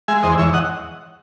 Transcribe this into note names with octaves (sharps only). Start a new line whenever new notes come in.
G#3 E5 G#5
E2 C5 D#5
E2 C#5 E5
D#5 F#5